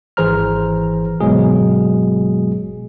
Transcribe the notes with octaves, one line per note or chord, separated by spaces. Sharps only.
G#1 E3 G#4 C5 A#5 F6
G1 B2 F#3 G#3 G#4